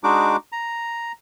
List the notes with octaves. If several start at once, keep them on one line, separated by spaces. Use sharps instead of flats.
G#3 D4 D#4 F#4 D6
A#5